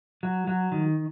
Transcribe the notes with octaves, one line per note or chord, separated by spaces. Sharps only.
F#3
F#3
D#3